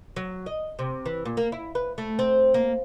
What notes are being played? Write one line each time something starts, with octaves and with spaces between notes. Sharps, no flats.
F#3
D#5
C3
E3
A#2
A#3
E4
B4
A3
C4
A#3